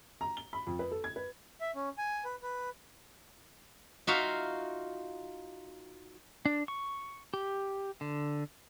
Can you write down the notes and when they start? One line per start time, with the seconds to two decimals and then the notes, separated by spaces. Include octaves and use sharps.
0.21 A#5
0.37 G7
0.53 B5
0.67 F2
0.79 B4
0.91 A4
1.04 G#6
1.16 B4
1.61 E5
1.75 C#4
1.98 G#5
2.25 B4
2.43 B4
4.07 D#4 F4 F#4 E5 F5
6.46 D4
6.68 C#6
7.34 G4
8.01 D3